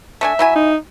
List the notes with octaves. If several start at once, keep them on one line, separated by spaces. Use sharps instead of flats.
A3 D4 E5 G#5
F#3 E4 G#5
D#4